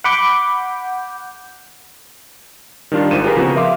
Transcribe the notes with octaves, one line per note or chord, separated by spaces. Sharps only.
F#5 B5 D6 G6
D#3 G3 D4 F4
G#1 G#2 D#7 E7
F4 G4 G#4 A#4 B4
C#3 F3 B3 C4 F#4 A#4
E5 F5 C6 D6